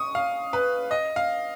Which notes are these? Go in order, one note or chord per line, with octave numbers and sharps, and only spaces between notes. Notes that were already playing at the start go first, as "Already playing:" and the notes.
Already playing: C#6 D#6
F5
B4
D#5
F5